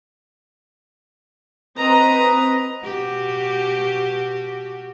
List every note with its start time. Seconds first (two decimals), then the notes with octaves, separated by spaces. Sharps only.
1.76 C4 B4 D#5 A#5
2.84 B2 F#4 G4